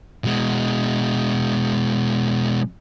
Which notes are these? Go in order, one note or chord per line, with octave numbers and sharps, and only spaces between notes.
B2 G#3